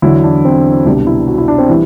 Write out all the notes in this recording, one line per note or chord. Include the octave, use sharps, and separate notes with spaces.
E2 D3 F#3 E4
D4
C4
C2 B2 G3 D4
E4
F#4
E4
D4
C4
E3 G3 E4